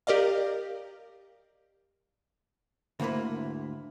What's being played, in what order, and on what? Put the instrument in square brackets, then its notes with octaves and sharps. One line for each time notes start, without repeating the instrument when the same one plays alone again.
[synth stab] G4 A#4 D5 D#5 F5
[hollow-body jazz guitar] D2 G#2 A#3 E4 B4